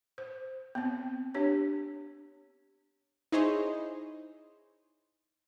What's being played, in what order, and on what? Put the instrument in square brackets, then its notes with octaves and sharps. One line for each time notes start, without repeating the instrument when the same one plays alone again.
[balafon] C5
B3 C4
D4 G4 C#5
[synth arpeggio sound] D#4 E4 G#4 C5 C#5 D#5